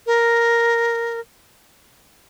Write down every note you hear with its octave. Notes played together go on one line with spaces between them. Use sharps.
A#4